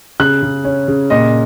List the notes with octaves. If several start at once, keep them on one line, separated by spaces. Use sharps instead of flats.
C#3 F#6
C#3
C#4
C#3
A#2 D#5